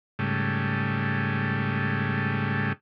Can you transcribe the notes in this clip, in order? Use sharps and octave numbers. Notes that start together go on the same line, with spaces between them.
G#2 C#3 G3 A3